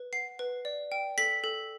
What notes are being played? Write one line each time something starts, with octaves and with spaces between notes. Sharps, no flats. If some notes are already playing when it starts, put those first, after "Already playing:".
Already playing: B4
F#5 C7
B4
D5
G5
A4 B6
A4